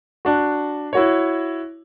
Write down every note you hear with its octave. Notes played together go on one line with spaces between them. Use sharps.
D4 F#4
E4 F#4 C#5